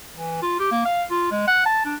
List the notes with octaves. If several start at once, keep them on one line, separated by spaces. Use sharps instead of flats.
E3
F4
G4
A#3
F5
F4
G#3
F#5
A5
D4